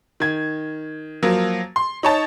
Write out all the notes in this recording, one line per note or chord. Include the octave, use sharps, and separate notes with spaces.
D#3 G#6
F3 F#3 A#3
C6
D#4 C#5 A5